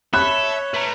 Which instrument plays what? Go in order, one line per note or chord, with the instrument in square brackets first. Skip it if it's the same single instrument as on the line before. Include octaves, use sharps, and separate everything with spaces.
[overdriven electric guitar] A4 [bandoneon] C#5 [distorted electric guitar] E5 [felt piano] B5 F#6
[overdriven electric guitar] A3 [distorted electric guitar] B4 A#5